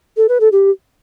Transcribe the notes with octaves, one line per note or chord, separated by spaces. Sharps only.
A4
B4
A4
G4